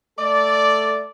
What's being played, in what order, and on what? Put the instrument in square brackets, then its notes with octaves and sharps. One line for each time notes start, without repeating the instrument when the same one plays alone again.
[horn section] A3 A4 D5